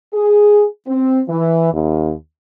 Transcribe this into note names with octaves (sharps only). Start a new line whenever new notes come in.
G#4
C4
E3
D#2